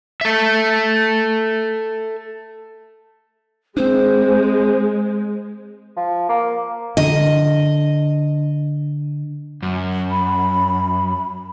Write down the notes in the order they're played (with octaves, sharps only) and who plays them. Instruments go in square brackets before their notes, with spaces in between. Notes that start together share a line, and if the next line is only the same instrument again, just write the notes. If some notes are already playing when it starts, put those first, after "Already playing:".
[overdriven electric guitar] A4 E5
[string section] G#3 [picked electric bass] C4 D4 [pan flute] C5
[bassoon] F3
A#3
[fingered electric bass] D3 [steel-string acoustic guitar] D#5
[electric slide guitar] F#2
[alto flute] B5